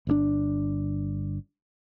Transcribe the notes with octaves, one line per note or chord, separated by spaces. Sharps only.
G1 A#2 D4